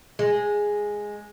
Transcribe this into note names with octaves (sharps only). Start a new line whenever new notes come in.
G#3